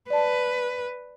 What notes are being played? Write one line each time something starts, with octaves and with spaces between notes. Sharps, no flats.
B4 D5 A5